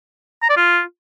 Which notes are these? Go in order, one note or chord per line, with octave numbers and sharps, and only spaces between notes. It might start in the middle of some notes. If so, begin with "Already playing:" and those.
A#5
D5
F4